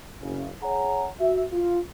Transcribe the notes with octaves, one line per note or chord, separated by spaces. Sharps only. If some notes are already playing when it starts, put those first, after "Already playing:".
F#1 C#3
G#4 C#5 F#5 G#5 A#5
F#4 E5
F4